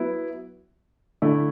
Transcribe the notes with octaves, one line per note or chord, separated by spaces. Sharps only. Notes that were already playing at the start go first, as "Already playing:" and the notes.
Already playing: F#3 B3 E4
D3 A3 E4